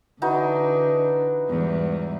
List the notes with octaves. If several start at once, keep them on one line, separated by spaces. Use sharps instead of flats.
D3 E3 D4 D#4 F#4
E2 G#2 G3